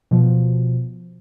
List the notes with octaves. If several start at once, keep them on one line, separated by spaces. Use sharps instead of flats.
B2 F3